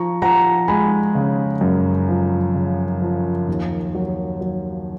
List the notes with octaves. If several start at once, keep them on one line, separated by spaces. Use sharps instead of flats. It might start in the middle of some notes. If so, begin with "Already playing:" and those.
Already playing: F3 A#5 C#6
F3 F#5 A#5
G#3 G#5 B5
C#3
F#2
F3
C#3
F3
D#2
F#3
F#3